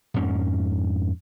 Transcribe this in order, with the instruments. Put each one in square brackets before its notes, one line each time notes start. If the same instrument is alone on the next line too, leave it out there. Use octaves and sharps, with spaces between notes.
[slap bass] F2 G#2 A#3 C#4